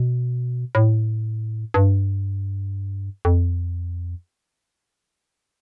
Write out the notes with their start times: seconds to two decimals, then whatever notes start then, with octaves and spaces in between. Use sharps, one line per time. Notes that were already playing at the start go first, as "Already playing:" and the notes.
Already playing: B2
0.75 A2
1.74 G2
3.25 F2